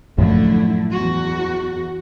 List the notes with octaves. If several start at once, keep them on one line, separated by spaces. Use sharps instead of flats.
F#2 A2 D3 F3 A3 E4
E2 F#4